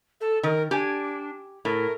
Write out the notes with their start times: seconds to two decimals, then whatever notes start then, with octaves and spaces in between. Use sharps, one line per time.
0.21 A4
0.43 D#3 A#4
0.71 D4 G4 G#5
1.65 A2 A#4